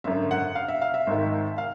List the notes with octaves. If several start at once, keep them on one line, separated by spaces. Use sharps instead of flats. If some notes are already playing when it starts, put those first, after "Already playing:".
G#1 F#2 D3 E5
F#5
F5
E5
F5
E5
G#1 G#2 D#3
F5